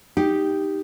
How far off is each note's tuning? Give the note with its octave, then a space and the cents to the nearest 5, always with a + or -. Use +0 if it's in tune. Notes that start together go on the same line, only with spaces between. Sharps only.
D#4 +0 G4 +0